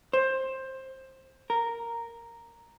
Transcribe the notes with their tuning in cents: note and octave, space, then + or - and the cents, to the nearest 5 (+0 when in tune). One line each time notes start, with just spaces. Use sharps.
C5 +15
A#4 -5